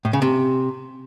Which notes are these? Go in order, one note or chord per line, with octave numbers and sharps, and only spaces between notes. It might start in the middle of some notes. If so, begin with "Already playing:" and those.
A2
C#3
C3